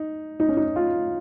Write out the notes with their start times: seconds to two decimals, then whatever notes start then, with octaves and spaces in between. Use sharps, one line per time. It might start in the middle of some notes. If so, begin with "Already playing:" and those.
Already playing: D#4
0.40 D#4
0.48 C#4
0.57 D#4
0.76 F4